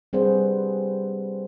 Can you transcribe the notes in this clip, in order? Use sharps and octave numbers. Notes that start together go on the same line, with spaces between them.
G3 C4 G#4 B4 C5 F#5